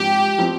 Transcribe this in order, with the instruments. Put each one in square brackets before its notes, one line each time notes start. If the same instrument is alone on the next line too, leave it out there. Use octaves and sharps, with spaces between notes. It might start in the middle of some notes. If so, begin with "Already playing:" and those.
Already playing: [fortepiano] G#2 F3 C4 [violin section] G4
[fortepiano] F3 C4